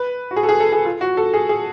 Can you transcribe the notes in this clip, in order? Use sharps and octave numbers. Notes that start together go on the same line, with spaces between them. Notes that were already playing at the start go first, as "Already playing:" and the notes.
Already playing: B4
F#4
G#4
A4
G#4
A4
G#4
F4
F#4
A4
G#4
G#4